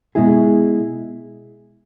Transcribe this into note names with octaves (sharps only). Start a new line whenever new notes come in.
B2 G#3 E4 G#4